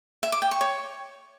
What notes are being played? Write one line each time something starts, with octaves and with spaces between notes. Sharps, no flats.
E5
D6
G5
C#6
C#5